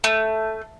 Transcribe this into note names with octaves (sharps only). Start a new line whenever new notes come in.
A3